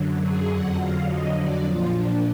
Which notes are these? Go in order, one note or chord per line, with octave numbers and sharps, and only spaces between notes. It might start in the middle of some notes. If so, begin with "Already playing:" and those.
Already playing: F#2 D3 F#3
G#4
F2 D3 F#3 F#5
F5
D#5
D5
A#2 F3 F4
D4